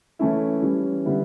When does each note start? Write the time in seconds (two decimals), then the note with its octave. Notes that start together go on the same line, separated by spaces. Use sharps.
0.19 E3 A3 C#4 E4
0.62 E3 G3 C#4
1.05 D3 G3 B3 E4